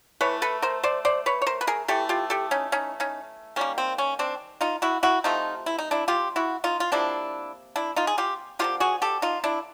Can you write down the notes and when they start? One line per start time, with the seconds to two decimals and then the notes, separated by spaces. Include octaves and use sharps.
0.21 E3 A3 B4 C#5
0.42 A4 B4
0.62 A#4 C5
0.83 C5 D5
1.05 C5 D5
1.26 B4 C#5
1.42 C#5
1.47 A#4 C5
1.61 B4
1.67 G#4 A#4
1.88 E3 A3 G4 A4
2.09 F4 G4
2.30 G4 A4
2.51 C#4 D#4
2.72 C#4 D#4
3.00 C#4 D#4
3.56 D#3 G3 A#3 C#4
3.78 C4
3.98 C#4
4.19 C4 D4
4.61 D#4 F4
4.82 E4 F#4
5.03 E4 F#4
5.24 C3 F3 A3 D#4 F4
5.66 E4
5.78 D#4
5.91 D4 E4
6.08 F4 G4
6.36 E4 F#4
6.64 D#4 F4
6.80 F4
6.92 C3 F3 A#3 D4 E4
7.76 D4 E4
7.96 D#4 F4
8.07 G#4
8.18 F4 G4
8.59 D3 F3 A#3 F4 G4
8.80 F#4 G#4
9.02 G4 A4
9.22 D#4 F4
9.44 D4 E4